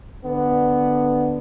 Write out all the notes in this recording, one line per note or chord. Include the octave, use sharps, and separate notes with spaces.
D3 B3